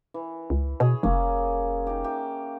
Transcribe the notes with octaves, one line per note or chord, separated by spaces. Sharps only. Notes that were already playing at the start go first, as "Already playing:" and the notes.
E3
C#2
B2 G#4 C#5
F1 A#3 C#4
D#4 G4
G4 E5